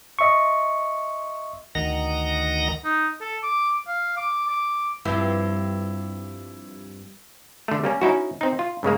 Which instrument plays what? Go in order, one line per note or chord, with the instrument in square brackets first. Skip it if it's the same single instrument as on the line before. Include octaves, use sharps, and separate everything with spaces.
[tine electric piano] D#5 E5 C6 C#6
[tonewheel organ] D2 D#3 D#5 F#5 A#5 A#6
[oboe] D#4
A4
D6
F5
D6
D6
[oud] G2 F3 C4 [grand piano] E4
[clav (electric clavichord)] D3 A3
G3 A#3 C#4
C#4 D#4 E4 F#4
C4 D#4
F4
G2 C#3 G#3 A#3